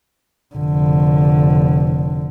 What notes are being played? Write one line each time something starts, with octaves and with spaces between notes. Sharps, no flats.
F1 D3